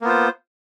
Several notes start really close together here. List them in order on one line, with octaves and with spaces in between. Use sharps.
A#3 B3 F4 C5